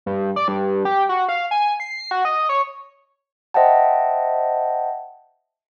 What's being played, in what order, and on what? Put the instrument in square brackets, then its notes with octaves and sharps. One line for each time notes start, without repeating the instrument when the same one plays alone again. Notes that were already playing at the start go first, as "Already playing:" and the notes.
[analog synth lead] G2
D5
G2
G4
F#4
F5
G#5
C7
F#4
D#5
C#5
[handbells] C5 D#5 E5 F#5 G5 A5